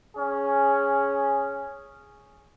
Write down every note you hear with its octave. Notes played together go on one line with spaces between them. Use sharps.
C#4 G#4